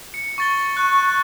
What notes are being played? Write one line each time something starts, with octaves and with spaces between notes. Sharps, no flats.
C#7
C#6 A6 G7
C#6 F#6